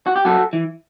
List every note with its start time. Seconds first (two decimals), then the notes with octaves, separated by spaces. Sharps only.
0.07 F#4
0.16 G4
0.25 F#2 F#4 A4
0.53 E3